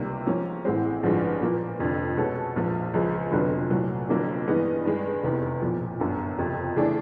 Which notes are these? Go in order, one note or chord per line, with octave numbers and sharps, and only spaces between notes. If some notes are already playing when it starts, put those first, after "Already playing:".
Already playing: C#2 C3 D#3 G3 A#3
G#2 F3 A#3 C#4
A1 A2 E3 G#3 C4
A1 G2 D3 F3 G#3
A#2 F3 A#3
F1 F2 D3
B2 G#3 C#4 F#4 A4
A#1 G#2 F3
C#2 C#3 F3
F1 F2 D3 F#3 B3
C2 A#2 F#3 A3
F1 F2 D3 F#3 A#3
G2 E3 G#3 B3 D#4
G2 D#3 G#3
F1 E2 C3 D#3
B1 A#2 F3
G1 F#2 D3
F#1 F2 C3
C#3 E3 A3 D4